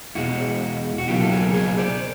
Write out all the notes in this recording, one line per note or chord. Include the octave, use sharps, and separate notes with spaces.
E2 B2 G#3 E4 F#4
F#4
C#2 B2 F#3 A#3 F4 G4
A4
G#4 A#4
G#4 A#4
C5 D5